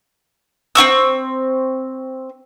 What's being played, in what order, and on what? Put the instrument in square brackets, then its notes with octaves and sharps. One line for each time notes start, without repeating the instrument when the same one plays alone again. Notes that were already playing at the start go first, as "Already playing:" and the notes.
[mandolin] C4 E4 C#6 E6